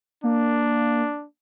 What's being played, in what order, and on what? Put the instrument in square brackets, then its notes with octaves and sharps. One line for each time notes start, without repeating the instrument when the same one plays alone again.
[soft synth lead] A#3 [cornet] D4